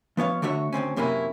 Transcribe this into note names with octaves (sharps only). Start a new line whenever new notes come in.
F3 B3 C#5 F5
D3 A3 F#4 C#5 E5
D2 G#2 C4 C#4
F#2 C3 A#3 C#4 E4